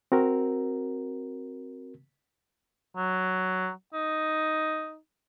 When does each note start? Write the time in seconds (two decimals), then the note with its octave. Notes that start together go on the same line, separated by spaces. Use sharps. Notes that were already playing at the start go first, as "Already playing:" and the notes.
0.12 C4 F#4 A#4
2.96 F#3
3.93 D#4